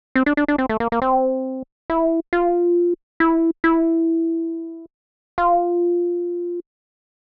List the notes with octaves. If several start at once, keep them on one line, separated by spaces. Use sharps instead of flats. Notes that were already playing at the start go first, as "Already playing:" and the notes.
C4
D4
D4
D4
C4
A3
A#3
A#3
C4
E4
F4
E4
E4
F4